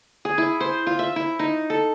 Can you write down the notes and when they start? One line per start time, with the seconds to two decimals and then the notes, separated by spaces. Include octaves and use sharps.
0.25 G#4
0.38 E4
0.60 C5
0.87 F4
0.99 E5
1.16 E4
1.39 D#4
1.70 A4